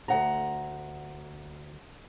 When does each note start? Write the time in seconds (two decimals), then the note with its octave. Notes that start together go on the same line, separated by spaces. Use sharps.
0.08 D2 F#5 A#5